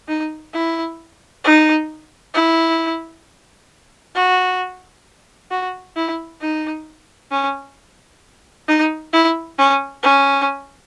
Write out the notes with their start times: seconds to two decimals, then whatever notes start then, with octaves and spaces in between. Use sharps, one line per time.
0.08 D#4
0.54 E4
1.44 D#4
2.35 E4
4.15 F#4
5.51 F#4
5.97 E4
6.41 D#4
7.32 C#4
8.68 D#4
9.13 E4
9.58 C#4
10.03 C#4